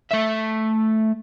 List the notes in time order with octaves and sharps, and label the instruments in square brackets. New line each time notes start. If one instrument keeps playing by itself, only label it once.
[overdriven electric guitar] A3 E5